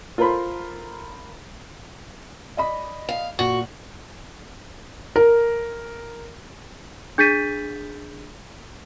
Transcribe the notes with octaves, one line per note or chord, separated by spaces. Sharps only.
F4 A4 A#4 C5 B5 C6
D5 D#5 B5
F5
A#2 F#4
A#4
D4 G#4 G6 A6 B6 D#7